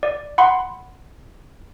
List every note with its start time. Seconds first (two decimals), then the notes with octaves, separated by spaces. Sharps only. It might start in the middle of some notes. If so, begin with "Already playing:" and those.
0.03 D5
0.38 F#5 B5 C6